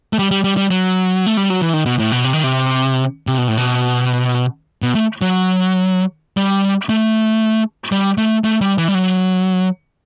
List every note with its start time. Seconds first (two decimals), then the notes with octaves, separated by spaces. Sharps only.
0.13 A3
0.19 G3
0.31 G3
0.44 G3
0.57 G3
0.70 F#3
1.26 A3
1.37 G3
1.50 F#3
1.61 E3
1.73 D#3
1.86 B2
1.99 A2
2.12 B2
2.24 C3
2.33 D#3
2.43 C3
3.27 C3
3.38 B2
3.48 A2
3.57 B2
4.82 B2
4.95 A3
5.22 F#3
6.37 G3
6.89 A3
7.92 G3
8.18 A3
8.44 A3
8.61 G3
8.78 E3
8.88 G3
8.95 F#3